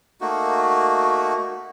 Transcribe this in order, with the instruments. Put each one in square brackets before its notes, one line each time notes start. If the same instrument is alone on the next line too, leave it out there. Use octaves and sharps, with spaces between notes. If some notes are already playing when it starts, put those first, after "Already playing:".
[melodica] A3 A#3 D#4 F#4